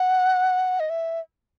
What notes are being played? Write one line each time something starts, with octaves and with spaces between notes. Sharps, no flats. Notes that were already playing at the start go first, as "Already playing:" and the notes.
Already playing: F#5
D#5
E5